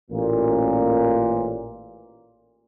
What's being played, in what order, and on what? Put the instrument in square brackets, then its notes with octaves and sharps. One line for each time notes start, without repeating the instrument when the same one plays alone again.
[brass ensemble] A1 A#2